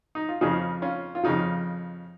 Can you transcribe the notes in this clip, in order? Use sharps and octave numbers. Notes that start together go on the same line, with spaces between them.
D#4
F4
F2 C#3 F3 D#4 G#4
C#4 F4
F4
F2 C#3 F3 D#4